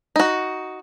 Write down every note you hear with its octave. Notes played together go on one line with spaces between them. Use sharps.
D#4 F#4